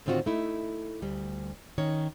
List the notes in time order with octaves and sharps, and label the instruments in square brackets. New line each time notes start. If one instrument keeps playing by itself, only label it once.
[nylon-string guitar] A2 D3 D#3 C4 F4 F#4
A3 D#4 E4
D2 G3
D#3 C#4 C#5